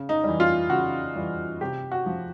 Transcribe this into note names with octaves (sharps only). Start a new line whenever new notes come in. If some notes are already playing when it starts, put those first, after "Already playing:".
Already playing: C#3
D#4
E3 G3
F4
C#3 F#4
E3 G3
C3 G4
F#4
F3